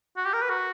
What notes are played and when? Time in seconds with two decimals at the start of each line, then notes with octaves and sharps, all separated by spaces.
0.17 F#4
0.25 G4
0.33 A#4
0.42 B4
0.50 F#4